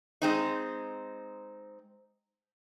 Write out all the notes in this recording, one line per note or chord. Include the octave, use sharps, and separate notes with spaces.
G#3 C4 D#4